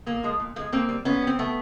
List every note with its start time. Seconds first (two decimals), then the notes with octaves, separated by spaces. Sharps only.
0.06 A#2 A#3
0.23 F3 G#3
0.40 A#2
0.56 F3 A#3
0.59 G#3
0.72 A#2 A#3 C4
0.89 G3
1.05 A#2 B3 C#4
1.22 G3
1.27 C4
1.39 B2 A3 B3